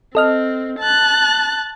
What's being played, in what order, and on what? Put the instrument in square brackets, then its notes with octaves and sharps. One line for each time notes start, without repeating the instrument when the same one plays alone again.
[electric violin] C4 [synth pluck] A4 D#5 F6
[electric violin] A5 F#6